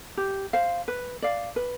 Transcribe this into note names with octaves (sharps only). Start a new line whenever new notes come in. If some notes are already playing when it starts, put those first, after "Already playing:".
G4
C5 F5
B4
D5 F5
B4